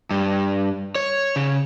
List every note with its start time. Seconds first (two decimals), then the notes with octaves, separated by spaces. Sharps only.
0.11 G2
0.95 C#5
1.36 C#3